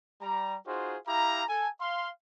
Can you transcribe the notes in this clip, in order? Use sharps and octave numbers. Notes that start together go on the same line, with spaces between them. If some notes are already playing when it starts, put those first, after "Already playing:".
G3 A#5
D#4 F4 F#4 G#4 C5
E4 G4 F5 A#5
A4 G#5
F5 C6